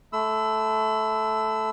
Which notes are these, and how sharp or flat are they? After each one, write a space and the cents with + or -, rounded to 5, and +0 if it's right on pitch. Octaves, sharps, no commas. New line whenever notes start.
A3 -10 B5 +35 E6 +0